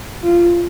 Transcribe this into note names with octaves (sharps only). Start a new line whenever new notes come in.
F4